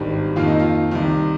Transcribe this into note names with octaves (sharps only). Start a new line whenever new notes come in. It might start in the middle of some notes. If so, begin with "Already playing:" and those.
Already playing: G#1 G2 D#3 G3
F2 D#3 A#3 F4
D#4
F4
C2 C3 D#3